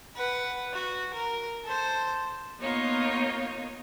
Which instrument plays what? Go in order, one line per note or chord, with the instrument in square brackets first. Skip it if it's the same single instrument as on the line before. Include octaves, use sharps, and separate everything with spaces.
[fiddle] B4 F#5
F#4
A#4
A4 C5
[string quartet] A#3 B3 D#4 F4 C#5